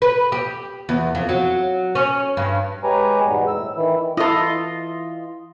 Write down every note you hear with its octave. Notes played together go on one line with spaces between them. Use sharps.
B4
G4
E2
F2
F#3
C#4
G2
G#3 G4 B4 C#5 G#5 A#5
E2 G#2 B2 G3 B3
A2 E6
D#3 E3 E4
E3 E4 F4 A4 D#5